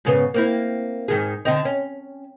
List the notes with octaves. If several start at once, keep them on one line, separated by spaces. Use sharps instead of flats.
G#2 C#3 B3
A#3 C4 E4
G#2 D#3 G#4
D3 C4 D#4
C#4